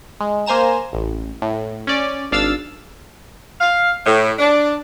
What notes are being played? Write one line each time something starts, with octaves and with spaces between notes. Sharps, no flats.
G#3
A#3 C5 G#5 A#5 E7
A1
A2
C#4 D5
G#1 D4 F5 E6 A6
F5
A2
D4